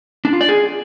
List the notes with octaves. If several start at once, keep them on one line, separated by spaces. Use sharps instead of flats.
D4
F4
D5
G#4